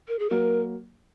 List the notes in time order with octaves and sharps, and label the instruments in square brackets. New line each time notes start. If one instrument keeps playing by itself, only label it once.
[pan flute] A#4
G#4
[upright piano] F#3 A#3 [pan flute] A#4